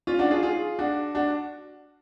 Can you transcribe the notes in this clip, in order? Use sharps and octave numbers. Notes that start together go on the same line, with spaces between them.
C#4 F4
D4 F#4
F4 G#4
F4 G#4
D4 F#4
D4 F#4